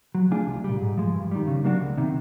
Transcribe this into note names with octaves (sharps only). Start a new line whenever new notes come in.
F#3
A3 D4 F4 G#4
C2
A#2 G3
G#2
F3 G#3
G2
D#3 G3
C#3
F#3 A#3 D4 F#4
C#2
C3 D#3